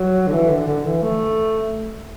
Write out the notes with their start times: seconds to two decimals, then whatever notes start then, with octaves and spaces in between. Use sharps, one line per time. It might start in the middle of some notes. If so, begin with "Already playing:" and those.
Already playing: F#3
0.27 D3
0.33 E3
0.50 D3
0.67 D3
0.85 E3
1.02 A3